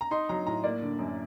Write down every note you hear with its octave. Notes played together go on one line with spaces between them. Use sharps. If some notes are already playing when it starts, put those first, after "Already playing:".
A#5
D#4 C6
F#3 A#5
A2 A#5
A#3 D5
D3
F#2